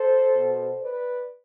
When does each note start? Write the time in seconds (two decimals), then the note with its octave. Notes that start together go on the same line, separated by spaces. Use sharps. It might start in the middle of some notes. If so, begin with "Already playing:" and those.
Already playing: A4 C5
0.34 B2
0.81 B4 D5